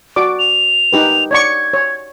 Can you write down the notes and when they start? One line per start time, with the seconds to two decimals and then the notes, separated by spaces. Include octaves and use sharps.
0.16 F#4 D5 D6
0.39 F7
0.93 D#4 G4 B4
1.31 C#5 D5 C#6 G#6
1.73 C#5